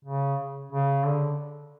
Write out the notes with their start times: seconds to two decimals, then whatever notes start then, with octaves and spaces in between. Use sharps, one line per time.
0.05 C#3
0.72 C#3
1.06 D3